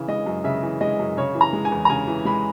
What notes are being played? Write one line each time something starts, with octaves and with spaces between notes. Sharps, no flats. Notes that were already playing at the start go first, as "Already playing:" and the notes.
Already playing: C#3 E3
G#3 D#5
F#2
C#3 E5
E3
G#3 D#5
F#2
C#3 C#5
E3
A#5
G#3
G#5
E2
A#5
C#3 G#5
E3
G#3 B5